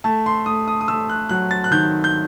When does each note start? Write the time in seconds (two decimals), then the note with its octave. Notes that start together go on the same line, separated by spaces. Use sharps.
0.04 A3 A5
0.26 C6
0.46 A3 D#6
0.68 D#6
0.81 D#6
0.88 A3 E6
1.09 F#6
1.29 F#3 F#6
1.51 A6
1.64 F#6
1.71 D#3 G6
2.04 G6